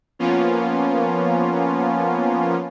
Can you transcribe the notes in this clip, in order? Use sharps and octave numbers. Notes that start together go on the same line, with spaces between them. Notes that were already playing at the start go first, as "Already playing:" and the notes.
F3 A#3 B3 C#4 F4